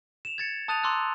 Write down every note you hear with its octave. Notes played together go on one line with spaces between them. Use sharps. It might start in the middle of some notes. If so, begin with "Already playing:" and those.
E7 F7
G#6 A6 C#7
A5 D#6 F#6 A6 D#7 F7
A#5 C6 D6 E6 F#6